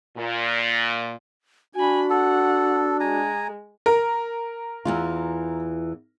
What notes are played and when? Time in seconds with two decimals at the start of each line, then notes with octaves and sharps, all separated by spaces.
0.17 A#2
1.75 D4 F#4 G#5 B5
2.10 A4 F#5
3.00 G#3 G#5 A#5
3.86 A#4
4.85 E2 E3 F4